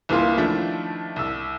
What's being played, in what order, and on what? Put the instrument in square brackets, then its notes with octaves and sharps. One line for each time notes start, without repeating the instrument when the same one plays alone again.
[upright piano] C2 E3 A#3 F4
D#3 F3 A3 D4 E4
C2 E6